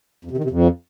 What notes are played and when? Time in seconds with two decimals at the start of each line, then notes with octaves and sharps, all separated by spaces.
0.25 F2
0.31 C3
0.37 D#3
0.44 C3
0.50 F2